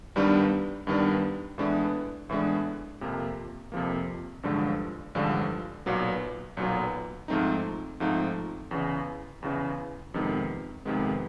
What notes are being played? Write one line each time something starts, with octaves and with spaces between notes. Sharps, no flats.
G2 D#3 G3 B3 D4
G2 D#3 G3 B3 D4
A2 E3 G#3 B3 D4
A2 E3 G#3 B3 D4
F2 C3 F3 A#3
F2 C3 F3 A#3
A1 G2 D3 F3 G#3
A1 G2 D3 F3 G#3
B1 A#2 F#3 B3
B1 A#2 F#3 B3
G#2 F3 A3 C4 D#4
G#2 F3 A3 C4 D#4
E2 C#3 E3
E2 C#3 E3
F2 C3 D#3 G#3 B3
F2 C3 D#3 G#3 B3